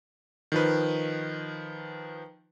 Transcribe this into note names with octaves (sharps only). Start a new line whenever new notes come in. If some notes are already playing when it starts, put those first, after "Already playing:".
D#3 F3 B4